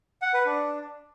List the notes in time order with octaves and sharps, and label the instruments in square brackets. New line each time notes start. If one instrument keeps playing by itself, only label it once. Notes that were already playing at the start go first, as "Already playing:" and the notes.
[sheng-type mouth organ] F#5
B4
D4